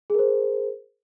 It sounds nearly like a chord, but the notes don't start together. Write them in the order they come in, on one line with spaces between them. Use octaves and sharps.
G#4 A#4 C5